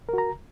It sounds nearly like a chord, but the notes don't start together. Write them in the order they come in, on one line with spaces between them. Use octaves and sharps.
A#4 F#4 A#5